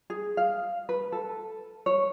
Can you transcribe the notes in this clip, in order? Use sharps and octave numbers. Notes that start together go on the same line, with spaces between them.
G#4
F5
B4
A4
C#5